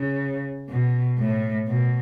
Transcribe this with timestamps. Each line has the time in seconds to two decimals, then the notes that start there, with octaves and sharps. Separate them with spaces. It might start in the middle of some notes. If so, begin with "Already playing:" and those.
Already playing: C#3
0.70 B2
1.19 A2
1.68 B2